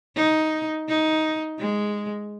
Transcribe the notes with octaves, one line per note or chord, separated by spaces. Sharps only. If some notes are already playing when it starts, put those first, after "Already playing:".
D#4
D#4
G#3